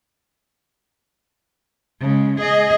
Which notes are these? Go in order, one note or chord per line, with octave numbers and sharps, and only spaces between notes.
C#3 G#3
G#4 D#5